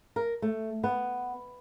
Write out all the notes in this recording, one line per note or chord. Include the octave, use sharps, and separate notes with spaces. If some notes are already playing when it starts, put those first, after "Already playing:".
A#4
A3
B3